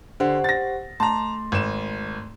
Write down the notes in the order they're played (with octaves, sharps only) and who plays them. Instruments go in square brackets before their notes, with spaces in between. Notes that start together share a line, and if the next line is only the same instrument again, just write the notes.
[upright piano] D3 [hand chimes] G4 C5 F#5
[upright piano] A6 A#6
[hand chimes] A3 C6 [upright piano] A5 A#5
[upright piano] G#1 E7